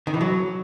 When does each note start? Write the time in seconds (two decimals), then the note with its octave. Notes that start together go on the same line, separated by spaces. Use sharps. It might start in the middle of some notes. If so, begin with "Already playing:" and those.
0.07 D#3
0.14 E3
0.21 F#3